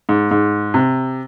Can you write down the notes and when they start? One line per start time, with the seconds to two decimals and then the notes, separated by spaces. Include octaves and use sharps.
0.09 G#2
0.31 G#2
0.74 C3